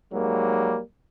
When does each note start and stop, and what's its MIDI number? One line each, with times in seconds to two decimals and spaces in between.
0.13 0.78 44
0.13 0.78 54
0.13 0.78 55
0.13 0.78 58